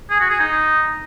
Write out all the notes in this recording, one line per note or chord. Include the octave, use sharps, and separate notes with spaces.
G#4
F#4
G#4
D#4